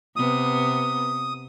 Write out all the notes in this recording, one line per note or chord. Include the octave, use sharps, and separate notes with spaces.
C3 B3 D#6